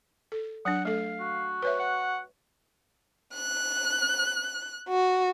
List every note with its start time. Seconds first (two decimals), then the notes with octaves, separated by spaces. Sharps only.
0.32 A4
0.65 F#3 D4 F#5
0.85 A3 A4 F5
1.20 F#4
1.62 B4 C#5 E5
1.79 F#5
3.33 F#6
4.88 F#4